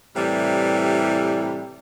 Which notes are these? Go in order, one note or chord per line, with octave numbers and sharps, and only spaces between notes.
A2 C3 E3 G3